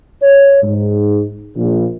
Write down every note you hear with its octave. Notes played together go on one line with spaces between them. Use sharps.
C#5
G#2
A#1